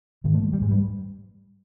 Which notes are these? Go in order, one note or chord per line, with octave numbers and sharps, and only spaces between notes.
G#2 D#3
A3
G#3
G3
G#2 G#3
G3